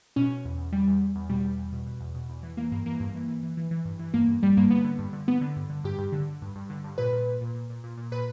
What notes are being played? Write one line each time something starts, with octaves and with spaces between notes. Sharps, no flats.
B2 C#4
B2
E2
E2
E2 G3
E2
E2
E2
B2 G3
E2
E2
B2
B2
E2
B2
E2
E3
E3 A#3
G2 A#3
E3 A#3
G2
E3
E3
E3
E3
E3
G2
E3
G2 A#3
G2
G2 G3
G2 A#3
D3 B3
D3
G2
D3
D3 B3
D3
G2
D3
G2 G4
G2
D3
D3
G2
G2
D3
G2
A#2 B4
A#2
A#2
A#2
A#2
A#2
A#2
A#2
A#2 B4